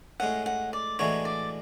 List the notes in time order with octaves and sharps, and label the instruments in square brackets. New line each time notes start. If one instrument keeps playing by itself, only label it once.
[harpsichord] A2 G#3 C#4 [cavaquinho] F#5
[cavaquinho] F#5
D5
[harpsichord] A2 E3 G#3 D4 F#4 [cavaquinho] C#5
[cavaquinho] D5